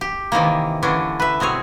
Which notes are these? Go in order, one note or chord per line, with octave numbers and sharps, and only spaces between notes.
G4
C3 D#3 E3 A#3
D3 E3 C#4 D4
B4 E5
B2 C4 G#4 C#5